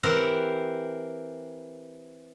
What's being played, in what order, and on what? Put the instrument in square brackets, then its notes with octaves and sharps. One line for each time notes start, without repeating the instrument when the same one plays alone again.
[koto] E3 C4 G4 A#4 C5 F#5